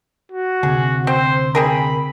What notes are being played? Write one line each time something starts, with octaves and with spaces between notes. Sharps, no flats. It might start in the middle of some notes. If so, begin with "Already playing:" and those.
F#4
D2 C3 G#4
C4 C5
C4 G#4 A#4 B5